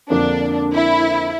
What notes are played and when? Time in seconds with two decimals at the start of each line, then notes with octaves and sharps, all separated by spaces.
0.10 F2 D3 A#3 D4
0.75 E4